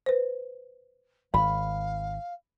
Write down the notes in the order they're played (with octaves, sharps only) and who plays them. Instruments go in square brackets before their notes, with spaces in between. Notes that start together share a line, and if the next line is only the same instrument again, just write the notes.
[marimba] B4 C5
[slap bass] G#1 [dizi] F5 [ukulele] B5